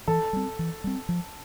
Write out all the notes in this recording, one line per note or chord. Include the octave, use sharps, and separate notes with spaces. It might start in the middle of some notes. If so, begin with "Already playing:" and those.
E3 A4
G3 C4
E3
G3 C4
F3